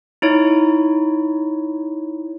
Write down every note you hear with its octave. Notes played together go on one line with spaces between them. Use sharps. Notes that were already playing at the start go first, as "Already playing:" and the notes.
D#4 E4 C#5